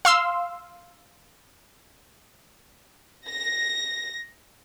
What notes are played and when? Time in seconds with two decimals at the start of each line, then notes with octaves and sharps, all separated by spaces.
0.05 F5 C6 E6
3.26 A#6